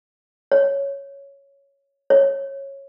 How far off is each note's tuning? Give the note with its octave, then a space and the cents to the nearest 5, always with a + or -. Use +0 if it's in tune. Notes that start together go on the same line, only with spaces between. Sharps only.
C#5 +0
C#5 -15